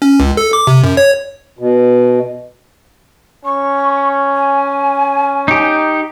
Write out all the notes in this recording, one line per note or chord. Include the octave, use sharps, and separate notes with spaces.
C#4
C#2
A4
D6
C3
F#2
C#5
B2
C#4 C#6
G#5
D#4 G4